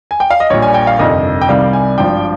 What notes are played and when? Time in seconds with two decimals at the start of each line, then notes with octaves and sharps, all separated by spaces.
0.11 G#5
0.20 G5
0.30 F5
0.40 D#5
0.50 A#1 A#2 G3 C#5
0.62 G#5
0.74 G5
0.87 F5
0.99 G1 F2 C3 D#3 D#5
1.41 G5
1.49 C2 C3 D#3 G3 F5
1.73 G#5
1.98 G#1 G2 F3 G5